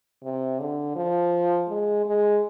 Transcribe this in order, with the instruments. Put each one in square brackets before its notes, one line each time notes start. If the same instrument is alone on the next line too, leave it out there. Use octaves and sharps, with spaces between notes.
[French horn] C3
D3
F3
G#3
G#3